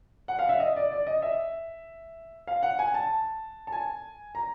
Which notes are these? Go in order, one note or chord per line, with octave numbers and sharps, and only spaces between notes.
F#5
F5
E5
D#5
D5
D5
D#5
E5
F5
F#5
G#5
A5
A5
G#5
A#5